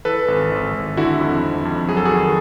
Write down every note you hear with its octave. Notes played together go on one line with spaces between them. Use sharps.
E3 A4 B4
G#1
G#1
G#1
D3 E4 F#4
F2
F2
F2
F#3 G#4
A4
F#4 G#4
D#3